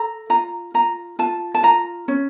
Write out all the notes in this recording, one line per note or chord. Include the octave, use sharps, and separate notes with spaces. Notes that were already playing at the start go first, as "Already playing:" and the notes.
Already playing: A4 A#5
F4 A#5
F4 A#5
F4 A5
A5
F4 A#5
C#4